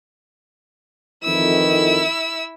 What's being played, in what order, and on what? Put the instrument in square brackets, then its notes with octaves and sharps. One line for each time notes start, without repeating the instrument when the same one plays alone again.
[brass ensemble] F2 D#3 E3 [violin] E4 E6